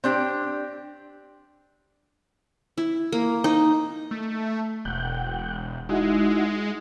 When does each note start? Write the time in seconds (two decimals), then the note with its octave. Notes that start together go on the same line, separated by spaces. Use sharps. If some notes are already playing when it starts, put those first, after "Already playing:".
0.04 C4 D4 G4
2.78 E4
3.12 A#3
3.44 D#4
4.11 A3
4.85 E1 F#5 G5
5.89 G#3 D#4 E4 F#4